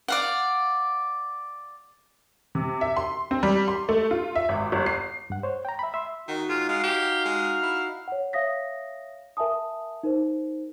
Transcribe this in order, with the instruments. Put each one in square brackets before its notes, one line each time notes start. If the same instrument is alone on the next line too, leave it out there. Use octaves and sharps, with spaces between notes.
[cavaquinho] D5 F5 F#5
[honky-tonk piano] C3
E5
C6
C4
G3
C6
A3
F4
E5
G#1
G1
C7
[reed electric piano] G2 F#5
C5 C#5
G5 A#5
E5 B5
E5 C6
[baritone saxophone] D#3 [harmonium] D#4 F#4 F#5
[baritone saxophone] G#2 [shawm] F4
[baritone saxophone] G#3 [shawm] F5
[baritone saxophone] G4
G#3
E4
[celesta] C#5 F#5
C#5 E5 F5 D#6 A#6 B6
A#4 E5 G#5 A5 D#6
D#4 A#4 C5